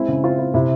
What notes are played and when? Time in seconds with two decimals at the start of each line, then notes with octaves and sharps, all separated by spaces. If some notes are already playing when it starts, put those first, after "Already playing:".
Already playing: G#3 C4 E4
0.08 C#3
0.24 C4 F4
0.38 C4 E4
0.54 C3 E4